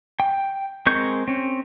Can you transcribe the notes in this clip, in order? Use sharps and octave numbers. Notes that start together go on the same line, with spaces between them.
G5
G#3 C4 A#4 C#6 G6
C4 C#4